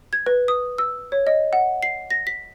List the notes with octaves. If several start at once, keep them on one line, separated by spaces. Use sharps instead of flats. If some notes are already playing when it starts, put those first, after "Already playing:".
G#6
B4
D#6
E6
C#5
D#5
F#5
C7
A#6
B6